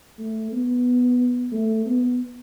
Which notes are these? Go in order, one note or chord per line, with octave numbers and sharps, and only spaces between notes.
A3
B3
A3
B3